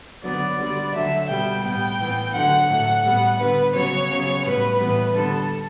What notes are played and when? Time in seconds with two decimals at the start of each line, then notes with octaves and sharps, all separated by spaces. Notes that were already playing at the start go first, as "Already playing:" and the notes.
0.22 D3 F#3 B3 D5
0.58 D3 G3 B3
0.92 D3 F#3 A3 E5
1.28 B2 G3 B3 G5
1.62 A2 G3 B3 G5
1.98 A2 E3 B3
2.33 D3 F#3 A3 F#5
2.68 A2 F#3 A3
3.03 A2 G3 B3
3.39 D3 G3 B3 B4
3.73 C#3 F#3 B3 C#5
4.08 C#3 F#3 B3
4.44 A2 G3 B3 B4
4.78 A2 E3 G3 B3
5.14 D3 G3 B3 A4